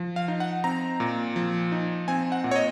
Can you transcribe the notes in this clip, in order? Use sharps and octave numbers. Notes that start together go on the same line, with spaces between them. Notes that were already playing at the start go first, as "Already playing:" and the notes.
Already playing: F3
F5
D#4
F#5
C4 A#5
A#2
F3
D#4
C4 G#5
F#5
A#2
C#5
D#5